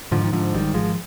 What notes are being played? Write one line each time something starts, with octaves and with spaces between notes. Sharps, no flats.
G#2 D3 F3
D#3
G#2 D3 F3
G#1 D#3 G3
G#1 F3 G#3